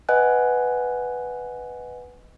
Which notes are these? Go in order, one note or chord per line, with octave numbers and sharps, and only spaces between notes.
B4 D#5 F#5 G#5 F#6